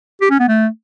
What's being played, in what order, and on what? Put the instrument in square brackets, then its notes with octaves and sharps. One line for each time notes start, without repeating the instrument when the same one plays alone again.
[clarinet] G4
C#4
B3
A3